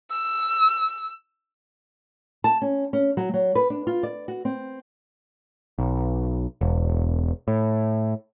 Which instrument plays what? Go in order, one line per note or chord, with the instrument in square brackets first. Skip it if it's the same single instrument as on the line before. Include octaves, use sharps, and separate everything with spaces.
[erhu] E6
[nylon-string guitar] A5
C#4
C#4
F#3
F#3
B4
D4
F4
D5
F#4
C4
[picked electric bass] B1
E1
A2